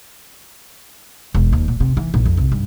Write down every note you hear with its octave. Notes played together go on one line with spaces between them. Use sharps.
E1
D#2
A#2
C3
E3
A#1
F2
C2
G2